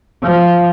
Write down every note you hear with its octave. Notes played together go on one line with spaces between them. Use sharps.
F3